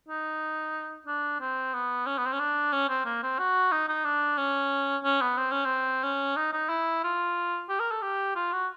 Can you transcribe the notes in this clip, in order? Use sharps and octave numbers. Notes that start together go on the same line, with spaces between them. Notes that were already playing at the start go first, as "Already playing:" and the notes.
D#4
D4
C4
B3
C#4
B3
C4
C#4
D4
C#4
C4
A#3
C4
F#4
D#4
D#4
D4
C#4
C#4
B3
C4
C#4
C4
C#4
D#4
D#4
E4
F4
G4
A#4
A4
G4
F4
F#4